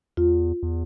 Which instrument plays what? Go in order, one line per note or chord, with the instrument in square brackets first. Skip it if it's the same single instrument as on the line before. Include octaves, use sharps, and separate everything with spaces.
[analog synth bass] E2 [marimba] F4
[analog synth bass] E2